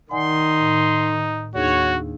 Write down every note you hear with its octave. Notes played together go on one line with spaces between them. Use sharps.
D#3 D#4 D5 F#5 G#5 C6
A2
D#2 D4 D#4 F#4 G#4 C#5